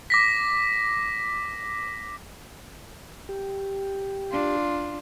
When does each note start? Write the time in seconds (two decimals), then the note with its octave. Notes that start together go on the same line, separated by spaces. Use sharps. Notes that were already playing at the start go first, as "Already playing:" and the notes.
0.10 D6 A#6 B6
3.29 G4
4.31 D4 F4